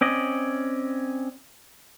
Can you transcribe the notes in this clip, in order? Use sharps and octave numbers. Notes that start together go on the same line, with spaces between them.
C4 C#4 D5 D#5